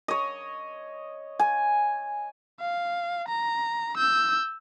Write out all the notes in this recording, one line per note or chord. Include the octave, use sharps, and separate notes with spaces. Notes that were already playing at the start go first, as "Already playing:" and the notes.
C#5 D#5
G#5
F5
A#5
E6 G6